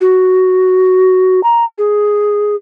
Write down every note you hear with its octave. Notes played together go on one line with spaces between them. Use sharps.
F#4
A#5
G#4